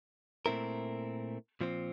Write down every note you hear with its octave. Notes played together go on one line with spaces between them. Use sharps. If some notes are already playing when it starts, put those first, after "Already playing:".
A#2 A3 C4 E4 A#4
A#2 F3 C4